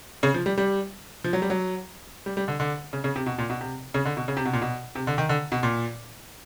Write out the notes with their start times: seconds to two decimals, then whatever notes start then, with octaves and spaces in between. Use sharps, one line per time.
0.23 C#3
0.34 F3
0.46 G3
0.58 G3
1.24 F3
1.33 F#3
1.42 G3
1.50 F#3
2.26 G3
2.37 G3
2.48 D3
2.60 D3
2.93 C#3
3.04 C#3
3.16 C3
3.26 B2
3.38 A#2
3.50 B2
3.61 C3
3.94 C#3
4.05 D3
4.17 B2
4.28 C#3
4.37 C3
4.45 B2
4.53 A#2
4.62 B2
4.95 C3
5.07 D3
5.18 D#3
5.29 D3
5.52 B2
5.63 A#2